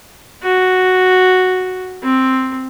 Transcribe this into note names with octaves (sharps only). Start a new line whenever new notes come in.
F#4
C4